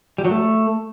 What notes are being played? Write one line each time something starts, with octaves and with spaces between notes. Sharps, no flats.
G3
F#3
A3